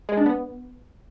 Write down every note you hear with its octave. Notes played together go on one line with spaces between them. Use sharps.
G#3
D4
B3